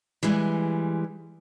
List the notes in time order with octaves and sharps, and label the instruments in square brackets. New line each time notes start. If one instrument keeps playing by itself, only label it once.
[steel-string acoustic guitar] E3 G3 G#3